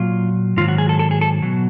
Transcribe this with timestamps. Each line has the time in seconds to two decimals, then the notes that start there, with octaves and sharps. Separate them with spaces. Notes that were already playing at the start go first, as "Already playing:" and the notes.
Already playing: A#2 F#3 F4
0.57 G#2 D#3 F#3 F4
0.68 F#4
0.78 G#4
0.89 A4
0.99 A4
1.11 G#4
1.21 A4
1.42 B2 F#3